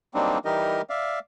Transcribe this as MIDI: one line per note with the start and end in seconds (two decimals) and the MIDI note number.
0.14 0.38 54
0.14 0.38 55
0.14 0.38 58
0.14 0.38 60
0.14 0.38 62
0.14 0.38 63
0.45 0.82 52
0.45 0.82 55
0.45 0.82 63
0.45 0.82 67
0.45 0.82 70
0.45 0.82 75
0.90 1.19 74
0.90 1.19 76
0.90 1.19 77